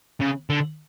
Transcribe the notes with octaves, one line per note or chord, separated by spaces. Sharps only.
C#3
D3